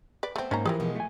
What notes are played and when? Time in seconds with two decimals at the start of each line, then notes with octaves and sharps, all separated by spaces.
0.23 B4 D5
0.36 A3 B3 C4 C5
0.51 G#2 A#3 C#4 D#4 A#5
0.65 E3 F3 E4 G4 G#4 A#4
0.80 B2 F3 G#3
0.96 A3 G#5